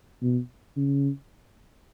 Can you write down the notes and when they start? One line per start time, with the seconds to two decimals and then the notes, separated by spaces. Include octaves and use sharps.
0.22 B2
0.76 C#3